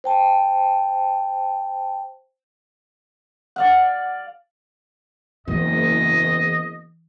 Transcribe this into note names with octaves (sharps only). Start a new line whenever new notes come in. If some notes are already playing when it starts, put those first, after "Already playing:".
C5 G5 A5
D5 F5 F#5
F#1 E2 E3 D#5